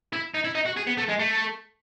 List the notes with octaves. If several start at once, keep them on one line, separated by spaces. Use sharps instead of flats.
E4
D#4
E4
D#4
F#4
G#4
B3
A3
G#3
A3